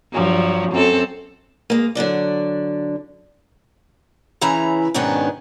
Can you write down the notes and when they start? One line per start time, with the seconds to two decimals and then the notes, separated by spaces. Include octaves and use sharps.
0.12 G2 F3 F#3
0.72 F#2 C4 A4
1.70 G#3 A#3
1.95 D3 F#3 D4 D5
4.41 C#3 E3 C#4 E4 A#5
4.94 G#2 B2 D#3 B3 C#4 D4